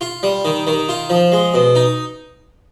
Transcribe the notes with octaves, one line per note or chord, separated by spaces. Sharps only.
F4
G3
D#3
D#3
F4
F3
G#3
B2
D#4